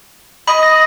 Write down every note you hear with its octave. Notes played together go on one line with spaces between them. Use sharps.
D#5 B5
A#6